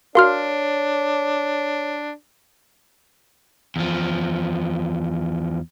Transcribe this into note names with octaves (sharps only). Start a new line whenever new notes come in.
D4 F#4 A#4 C#5 F5 C6 F6
E2 F3